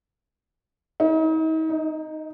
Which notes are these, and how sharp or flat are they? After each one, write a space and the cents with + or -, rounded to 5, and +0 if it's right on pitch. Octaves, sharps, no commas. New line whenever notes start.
D#4 +40
D#4 +0